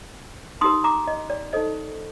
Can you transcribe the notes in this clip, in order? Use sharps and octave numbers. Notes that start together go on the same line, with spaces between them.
D#4 G4 A#4 C6 D#6
A#5 D6
D#5
D5
D#4 A4 C5 D#5